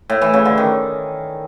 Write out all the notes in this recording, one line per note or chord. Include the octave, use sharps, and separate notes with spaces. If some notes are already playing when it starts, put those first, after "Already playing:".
A2
E3
C#3
D3
D#3